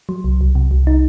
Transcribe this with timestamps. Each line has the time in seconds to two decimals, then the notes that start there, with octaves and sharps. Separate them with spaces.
0.09 F#3
0.24 C2
0.41 C2
0.55 C3
0.71 C2
0.87 D#4